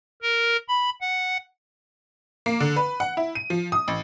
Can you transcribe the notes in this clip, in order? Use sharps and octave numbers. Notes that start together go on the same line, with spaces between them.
A#4
B5
F#5
A#3
D3
B4
F#5
E4
D#7
F3
D#6
A1